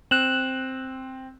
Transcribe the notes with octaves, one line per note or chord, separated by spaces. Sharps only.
C4 F#6 E7 F#7